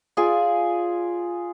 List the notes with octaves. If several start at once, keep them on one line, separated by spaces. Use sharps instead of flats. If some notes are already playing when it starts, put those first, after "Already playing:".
F4 G#4 D5 G#5